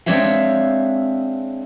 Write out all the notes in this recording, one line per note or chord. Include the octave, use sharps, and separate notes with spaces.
G#3 C4 D4 C#5 E5 F5